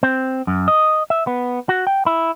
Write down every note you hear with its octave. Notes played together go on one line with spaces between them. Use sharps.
C4
F#2
D#5
E5
B3
F#4
G5
E4